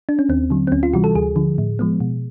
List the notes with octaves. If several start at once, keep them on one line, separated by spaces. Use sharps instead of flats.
D4
C#4
D#2 C4
D3 F#3
C4
D2 C#4
F4
C3 E3 G3 F#4
A4
D2 G#4
D3 F3
A2
F3 G#3 B3
B2